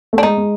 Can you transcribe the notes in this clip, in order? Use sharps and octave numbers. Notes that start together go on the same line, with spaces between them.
A3
D4
G#3 D#4
G#3